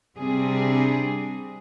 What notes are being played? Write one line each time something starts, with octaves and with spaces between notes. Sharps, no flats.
C3 G3 C4 D4 G#4